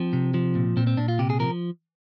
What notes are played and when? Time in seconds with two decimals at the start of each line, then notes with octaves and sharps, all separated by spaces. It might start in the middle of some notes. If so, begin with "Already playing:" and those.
Already playing: F3 C4
0.13 C3
0.34 F3
0.55 A#2
0.77 A#2 C4
0.87 C4
0.97 A#2 D4
1.08 F4
1.19 C3 G4
1.30 G#4
1.40 F3 A#4